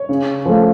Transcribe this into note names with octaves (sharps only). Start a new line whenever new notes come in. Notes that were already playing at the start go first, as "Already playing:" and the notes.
Already playing: C#5
C#3
F3 A3